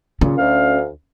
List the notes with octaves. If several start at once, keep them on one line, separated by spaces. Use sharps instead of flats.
A#2 C#3 C#4
D2 F5